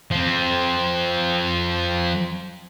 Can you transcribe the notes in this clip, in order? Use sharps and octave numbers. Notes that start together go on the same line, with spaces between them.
F3 C4